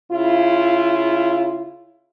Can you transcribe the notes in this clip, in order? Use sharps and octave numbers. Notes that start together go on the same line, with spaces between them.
C#3 E4 F4